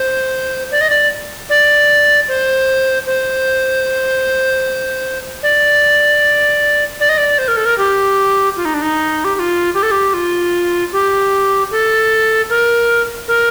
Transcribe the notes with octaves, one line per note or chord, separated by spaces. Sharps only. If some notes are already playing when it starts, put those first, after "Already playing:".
Already playing: C5
D5
D#5
D5
D5
C5
C5
D5
D5
D#5
D5
C5
A#4
A4
A#4
G4
F4
D#4
D4
D#4
G4
G4
F4
G4
A4
G4
F4
G4
A4
A#4
A#4